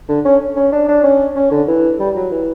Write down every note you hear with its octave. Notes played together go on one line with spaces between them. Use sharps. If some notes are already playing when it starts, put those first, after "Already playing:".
D3
C#4
C#4
D4
D4
C#4
C#4
D3
E3
G3
F#3
E3